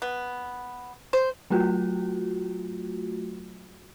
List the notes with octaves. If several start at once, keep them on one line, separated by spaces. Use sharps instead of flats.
B3
C5
F#3 A3 F4 F#4